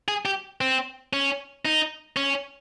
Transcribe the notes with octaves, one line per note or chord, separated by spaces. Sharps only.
G#4
G4
C4
C#4
D#4
C#4